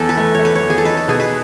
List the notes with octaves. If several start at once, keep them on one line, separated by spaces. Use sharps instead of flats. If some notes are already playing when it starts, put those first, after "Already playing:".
Already playing: E2 A4
B4
A3
A3 C#5
B4
C#5
E2
G#4
A4
D#4 B4
B4
B2 G#4
B4